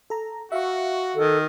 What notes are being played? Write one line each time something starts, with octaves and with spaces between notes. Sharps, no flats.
A4 A#5
F#4 E5 F5 C#6
D#3 A4